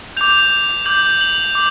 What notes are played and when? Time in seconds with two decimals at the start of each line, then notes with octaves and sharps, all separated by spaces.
0.17 D6 G6 F7
0.86 D6 G6 F#7
1.21 F#7
1.55 D6